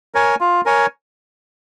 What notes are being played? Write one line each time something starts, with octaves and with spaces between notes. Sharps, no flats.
A#4 C#5 G#5
F4
A#4 C#5 G#5